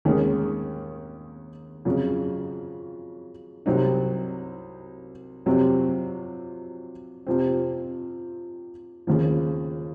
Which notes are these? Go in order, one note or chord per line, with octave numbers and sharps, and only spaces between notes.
D#2 D#3 G#3 C#4
F2 C#3 F#3
C2 C3 F#3 C4 D#4
F2 C3 F#3 C4
F2 C3 F3 C4
D#2 C#3 F3